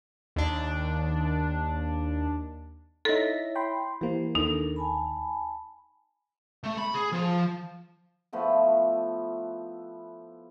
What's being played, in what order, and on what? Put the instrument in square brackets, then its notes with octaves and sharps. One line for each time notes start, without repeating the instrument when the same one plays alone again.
[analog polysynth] D#2 D4
[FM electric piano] D#4 A#6 B6 [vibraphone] E4 C#5 E5 [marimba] A4
[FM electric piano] G5 B5 C6
[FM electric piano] E3 A#3 [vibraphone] G4 C5
[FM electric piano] D#2 [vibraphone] D4 A4 A#4 [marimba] D#4
[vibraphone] G#5 A5 B5
[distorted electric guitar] A3
B5
G#4
F3
[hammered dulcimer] F3 A3 B3 E4